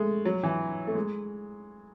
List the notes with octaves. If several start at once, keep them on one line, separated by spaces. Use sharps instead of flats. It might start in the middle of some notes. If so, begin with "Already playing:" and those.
Already playing: G#3 A3
F#3
E3
A3
G#3